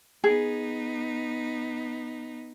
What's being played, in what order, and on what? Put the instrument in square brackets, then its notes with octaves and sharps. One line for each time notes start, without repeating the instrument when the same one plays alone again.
[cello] B3 D#4 [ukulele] G#4